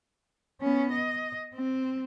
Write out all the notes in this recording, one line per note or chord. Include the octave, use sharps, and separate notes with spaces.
B3 C#4
D#5
C4